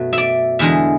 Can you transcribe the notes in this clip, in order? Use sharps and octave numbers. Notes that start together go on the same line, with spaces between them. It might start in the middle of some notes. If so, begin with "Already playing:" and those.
Already playing: F#2 B2 F#3 A3 F#4
D5 E5
E2 D3 G#3 E5